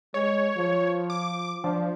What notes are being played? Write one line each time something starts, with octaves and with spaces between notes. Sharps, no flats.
G#3 C#5
F3
D6
F3 D4